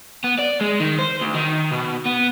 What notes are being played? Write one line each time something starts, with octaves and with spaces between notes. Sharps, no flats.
B3
D5
G#3
D#3
C5
D2
D#3
B2
B3